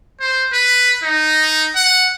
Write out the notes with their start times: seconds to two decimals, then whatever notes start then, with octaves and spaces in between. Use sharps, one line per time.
0.20 C5
0.53 B4
1.03 D#4
1.76 F#5